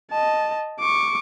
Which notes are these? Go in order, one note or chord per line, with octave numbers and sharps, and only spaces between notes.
D#5 A5
C#6 D6